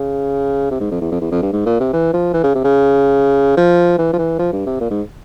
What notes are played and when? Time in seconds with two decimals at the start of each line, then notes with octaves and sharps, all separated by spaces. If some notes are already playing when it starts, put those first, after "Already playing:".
Already playing: C#3
0.71 C3
0.80 G#2
0.91 F2
1.01 E2
1.12 F2
1.21 E2
1.32 F2
1.42 G2
1.53 G#2
1.66 A#2
1.80 C3
1.93 E3
2.14 F3
2.34 E3
2.44 C#3
2.55 C3
2.64 C#3
3.57 F3
3.98 E3
4.13 F3
4.19 E3
4.39 F3
4.53 G2
4.66 C3
4.81 A#2
4.91 G#2